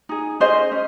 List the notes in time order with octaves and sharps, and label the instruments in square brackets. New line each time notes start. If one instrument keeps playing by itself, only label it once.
[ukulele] D#4 G#4
C#4 G#4 C5 D#5
C#4